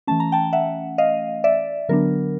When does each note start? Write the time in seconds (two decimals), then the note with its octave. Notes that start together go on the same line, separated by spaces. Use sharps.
0.07 E3 A3 C#4 A5
0.20 A#5
0.32 G5 A5
0.53 E5 F#5
0.98 D#5 F5
1.44 D5 E5
1.89 D3 F#3 B3 D4 A#4